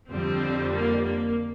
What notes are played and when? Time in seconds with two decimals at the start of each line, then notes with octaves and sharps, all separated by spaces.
0.10 F2 D3 G3 C4
0.72 A#3
1.04 A#3